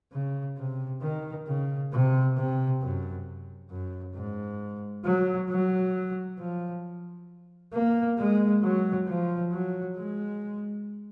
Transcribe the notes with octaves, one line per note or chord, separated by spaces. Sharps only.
C#3
C3
D#3
C#3
C3
C3
F#2
F#2
G#2
F#3
F#3
F3
A#3
G#3
F#3
F3
F#3
G#3